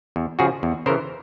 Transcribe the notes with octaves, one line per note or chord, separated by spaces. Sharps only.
E2
C#3 F3 F#4 G#4
E2
C#3 E3 A#4 C5